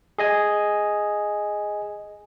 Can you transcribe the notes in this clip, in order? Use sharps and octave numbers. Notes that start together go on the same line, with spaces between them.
G#4 D#5 G#5